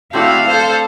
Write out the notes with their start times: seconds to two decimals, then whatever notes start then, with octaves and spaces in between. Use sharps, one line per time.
0.13 A3 C4 D4 E4 F#4 F5
0.47 A4 C5